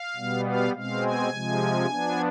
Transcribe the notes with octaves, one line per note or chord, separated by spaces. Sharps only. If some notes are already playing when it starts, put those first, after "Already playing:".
Already playing: F5
B2 G3 B3
F5
B2 G#3 C4 F5
G#5
C3 F3 G#3
F3 B3 D4